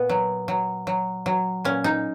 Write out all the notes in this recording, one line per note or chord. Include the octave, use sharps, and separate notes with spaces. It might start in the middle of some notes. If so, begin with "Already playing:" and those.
Already playing: A#2 B3
F#3
F#3
F#3
F#3
A#2 C#4
D#4